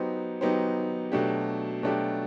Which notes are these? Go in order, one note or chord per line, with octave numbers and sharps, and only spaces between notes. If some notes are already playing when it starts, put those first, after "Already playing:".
Already playing: F#3 B3 D#4 G4 C5
F#3 B3 D#4 G4 C5
B2 F#3 A3 D4 G4
B2 F#3 A3 D4 G4